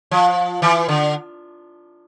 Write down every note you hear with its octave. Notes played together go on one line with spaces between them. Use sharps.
F3
E3
D3